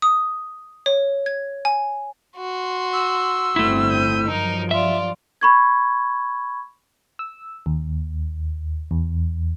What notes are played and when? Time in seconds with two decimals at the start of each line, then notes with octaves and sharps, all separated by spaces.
0.02 D#6
0.86 C#5
1.26 G#6
1.65 G#5
2.37 F#4 C6
2.93 E6
3.56 G1 D3 A3 C4 E4
3.89 G6 D#7
4.27 G2 F3 F#3 D#4 A#4
4.71 F4 D5 E5
5.41 B5 C#6 G#6
7.19 E6
7.66 D#2
8.91 E2